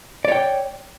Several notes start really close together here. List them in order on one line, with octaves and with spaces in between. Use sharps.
D5 C#5 G5